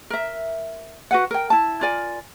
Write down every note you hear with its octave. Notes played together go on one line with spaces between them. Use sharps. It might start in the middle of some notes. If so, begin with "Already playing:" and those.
A#4 E5
F#4 B4 F#5
A#4 G5
E4 A5
F4 A#4 D5 G#5